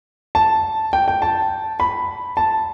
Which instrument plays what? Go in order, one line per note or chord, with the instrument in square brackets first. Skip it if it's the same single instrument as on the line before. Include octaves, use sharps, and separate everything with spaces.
[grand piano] A5
G5
G5
A5
B5
A5